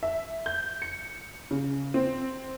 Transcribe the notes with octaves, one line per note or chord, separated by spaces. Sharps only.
E5
G6
C#7
C#3
C4